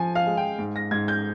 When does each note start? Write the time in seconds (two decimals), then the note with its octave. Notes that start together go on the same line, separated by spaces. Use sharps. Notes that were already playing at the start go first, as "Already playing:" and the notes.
Already playing: F3 G#5
0.15 F5
0.27 G#3
0.37 G5
0.59 G#2
0.76 A#6
0.91 G#2 G#6
1.08 G6